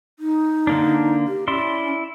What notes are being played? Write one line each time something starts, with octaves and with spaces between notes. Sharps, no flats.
D#4
D3 A#3 D4
G4
C#4 E4 D5 C6